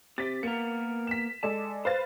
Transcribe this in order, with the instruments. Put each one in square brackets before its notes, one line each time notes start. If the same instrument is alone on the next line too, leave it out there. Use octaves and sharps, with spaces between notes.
[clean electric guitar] C3 [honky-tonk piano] A6 B6
[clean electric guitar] A#3 B3 A#4 [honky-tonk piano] C#7
[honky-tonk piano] B6 E7
[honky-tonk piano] G#3 A4 D5 [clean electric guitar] A5
[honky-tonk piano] B4 F5 A6 [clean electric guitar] C5